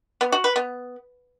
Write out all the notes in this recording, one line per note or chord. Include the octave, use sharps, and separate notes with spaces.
B3
F#4
B4
B3